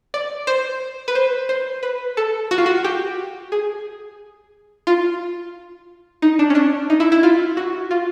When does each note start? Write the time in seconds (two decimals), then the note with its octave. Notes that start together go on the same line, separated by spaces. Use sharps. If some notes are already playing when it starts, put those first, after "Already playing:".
0.14 D5
0.47 C5
1.08 B4
1.15 C5
1.49 C5
1.83 B4
2.17 A4
2.51 F#4
2.58 F4
2.66 F#4
2.84 G4
3.52 G#4
4.87 F4
6.22 D#4
6.39 D4
6.50 C#4
6.55 D4
6.90 D#4
7.00 E4
7.12 E4
7.23 F4
7.57 F#4
7.91 F4